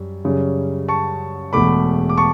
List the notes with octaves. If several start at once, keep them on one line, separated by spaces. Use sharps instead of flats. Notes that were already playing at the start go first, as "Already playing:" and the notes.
Already playing: F#2 G3
F#2 C#3 G3 C#4
A5 C#6
E1 E2 B2 A3 B5 D6
D6
A5 C#6